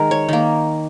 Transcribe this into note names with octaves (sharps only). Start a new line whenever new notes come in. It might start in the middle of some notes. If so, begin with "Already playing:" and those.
Already playing: D#3 G#3 A#4
C#5
D#3 A#3